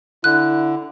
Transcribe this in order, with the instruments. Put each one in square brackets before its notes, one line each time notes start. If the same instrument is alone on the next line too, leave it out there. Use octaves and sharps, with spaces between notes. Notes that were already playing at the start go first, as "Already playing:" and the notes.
[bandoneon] D3 [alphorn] E4 [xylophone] F#6